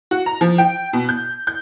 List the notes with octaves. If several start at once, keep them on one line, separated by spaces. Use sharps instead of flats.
F#4
A#5
F3
G5
B2
G6
G6